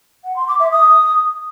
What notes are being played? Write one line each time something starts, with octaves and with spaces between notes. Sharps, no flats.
F#5
C6
D6
E5
D#6